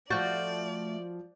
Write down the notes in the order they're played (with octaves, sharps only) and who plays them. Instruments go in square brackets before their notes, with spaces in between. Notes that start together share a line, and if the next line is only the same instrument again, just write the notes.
[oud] F3 F#4 [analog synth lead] A3 [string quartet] D5 [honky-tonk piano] G6 A6